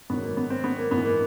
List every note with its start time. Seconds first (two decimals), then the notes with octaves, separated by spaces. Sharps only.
0.10 G#2 D#3 F#3 B3
0.23 A#3
0.37 B3
0.50 C4
0.64 B3
0.78 A#3
0.91 G#2 E3 B3
1.05 A#3